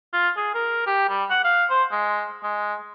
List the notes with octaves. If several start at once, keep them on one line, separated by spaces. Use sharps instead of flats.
F4
G#4
A#4
G4
G3
F#5
F5
C5
G#3
G#3